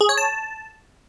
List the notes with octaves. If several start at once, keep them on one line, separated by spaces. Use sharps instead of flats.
G#4
C#5
A5